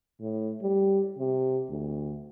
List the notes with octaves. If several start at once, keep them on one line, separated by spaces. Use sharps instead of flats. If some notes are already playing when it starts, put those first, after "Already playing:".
A2
G3
C3
D2